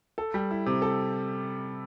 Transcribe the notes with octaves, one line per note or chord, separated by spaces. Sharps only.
A4
G3
E4
C3
A4